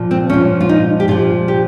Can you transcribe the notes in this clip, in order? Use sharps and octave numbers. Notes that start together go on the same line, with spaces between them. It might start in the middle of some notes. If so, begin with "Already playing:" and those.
Already playing: A#2 F3
C4
A#2 F3 C#4
F4
D#4
G4
A#2 F3 F4
G4